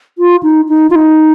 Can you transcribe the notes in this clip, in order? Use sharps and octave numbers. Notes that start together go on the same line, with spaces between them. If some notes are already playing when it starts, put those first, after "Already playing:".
F4
D#4
D#4
F4
D#4